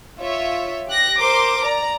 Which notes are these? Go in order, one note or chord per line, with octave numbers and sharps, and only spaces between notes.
F4 C#5 E5
G4 F#6 A#6
A#4 C5 C6 D6
D5 A#5